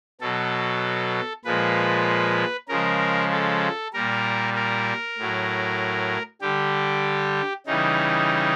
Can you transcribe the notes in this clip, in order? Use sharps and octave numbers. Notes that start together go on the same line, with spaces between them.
B2 F#3 A4
A#2 F3 G#3 B4
C#3 F3 G#3 A#4
A4
A#2 G3 A#4
A#4
A2 F#3
D3 G3 G4
C#3 E3 G3 D#4